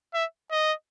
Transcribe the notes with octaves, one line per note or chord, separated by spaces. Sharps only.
E5
D#5